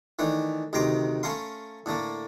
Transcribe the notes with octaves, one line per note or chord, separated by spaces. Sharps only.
D#3 E3 A3 D4
D2 C3 D#3 A#5 C6 D6
A3 C#4 A#4 F5 C6
A2 D3 A3 A#3